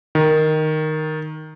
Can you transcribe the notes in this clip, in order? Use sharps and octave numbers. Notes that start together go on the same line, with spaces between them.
D#3